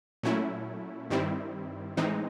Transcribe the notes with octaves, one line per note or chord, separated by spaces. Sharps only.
A#2 F#3 A3 C#4 E4
G2 D#3 G3 C4 E4
A2 E3 G#3 C4 D#4